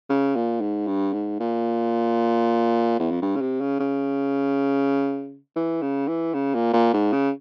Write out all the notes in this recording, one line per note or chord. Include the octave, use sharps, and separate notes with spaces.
C#3
A#2
G#2
G2
G#2
A#2
E2
F2
G2
C#3
C3
C#3
C#3
E3
C#3
E3
C#3
A#2
A#2
G#2
C#3